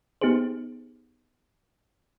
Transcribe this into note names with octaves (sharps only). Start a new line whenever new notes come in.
B3 D#4 G4 G#4 C5